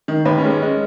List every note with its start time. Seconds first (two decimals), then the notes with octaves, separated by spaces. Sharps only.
0.08 D#3
0.25 D#2 B4
0.38 C#4
0.44 G#3
0.50 C#4
0.62 G#3